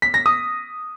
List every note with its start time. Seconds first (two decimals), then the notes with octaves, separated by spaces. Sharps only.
0.02 B6
0.14 A#6
0.26 D#6